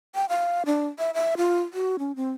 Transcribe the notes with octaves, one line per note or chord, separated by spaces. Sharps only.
G5
F5
D4
E5
E5
F4
F#4
C#4
C4